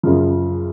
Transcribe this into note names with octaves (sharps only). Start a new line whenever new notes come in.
F#2 C#3 F3